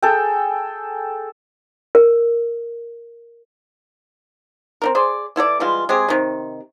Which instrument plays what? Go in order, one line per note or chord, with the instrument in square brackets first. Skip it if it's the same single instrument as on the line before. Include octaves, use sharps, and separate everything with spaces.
[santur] G#4 A4 G5
[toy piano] A#4
[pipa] C4 D#4 A#4
G#4 C5 D5
E3 E4 A4 D5
E3 G3 G#3 F4
G#3 C4 G4 G#4
C3 D#3